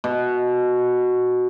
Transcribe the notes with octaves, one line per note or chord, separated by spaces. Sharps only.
B2